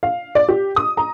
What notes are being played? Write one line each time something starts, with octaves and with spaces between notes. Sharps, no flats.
F5
D5
G4
D#6
A#5